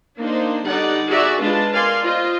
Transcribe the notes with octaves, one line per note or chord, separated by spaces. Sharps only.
A#3 D4 D#4 C5
D3 G3 D#4 D5 F#5
F#4 G#4 D5 E5 A#5
G#3 D4 F4 B4 A5
A#4 D5 F5 G#5 C6
F4 C5 D#5